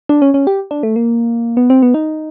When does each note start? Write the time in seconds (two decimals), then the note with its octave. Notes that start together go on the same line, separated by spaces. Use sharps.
0.09 D4
0.22 C#4
0.34 C#4
0.47 G4
0.71 D4
0.83 A3
0.96 A#3
1.57 B3
1.70 C4
1.83 B3
1.94 D#4